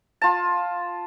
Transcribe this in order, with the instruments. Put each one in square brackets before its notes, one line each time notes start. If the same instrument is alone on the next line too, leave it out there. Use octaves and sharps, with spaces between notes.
[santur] F4 A5